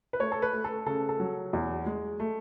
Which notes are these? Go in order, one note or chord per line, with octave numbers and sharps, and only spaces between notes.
B4
A3 C#5
A4
B4
A3
A4
C#3 A4
A4
F#3
E2
G#3
A3